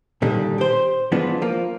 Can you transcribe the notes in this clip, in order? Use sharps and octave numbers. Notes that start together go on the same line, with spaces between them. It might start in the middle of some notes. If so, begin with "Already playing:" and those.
A#2 D3 D#3 G3 D4
G4 C5
E3 F3 G#3 B3 D4 F4
F3 A#3